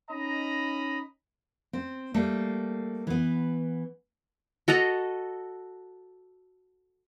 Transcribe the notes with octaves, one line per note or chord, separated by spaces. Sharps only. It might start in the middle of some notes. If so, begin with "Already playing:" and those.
C#4 D#4 D#5 A#5 B5
C4
G3 A3 A#3
E3 B3
F#4 A4 D#5 A#5